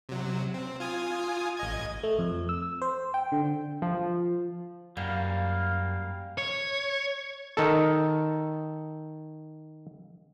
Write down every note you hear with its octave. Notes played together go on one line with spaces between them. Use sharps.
C3 F#3
C4
F4 G#5 D#6
A1 D#5 G#6
A3
F2
E6
C5
G5
D3
F3
F#2 G3 A#3 F5
C#5
D#3 A4